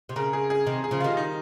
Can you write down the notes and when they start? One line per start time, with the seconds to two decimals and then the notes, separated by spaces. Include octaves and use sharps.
0.09 C3
0.16 C#3 A#4
0.33 G#4
0.50 G#4
0.66 C3 D#3
0.84 G#4
0.91 C#3 F3
1.00 D#3 G3 F4
1.17 D#4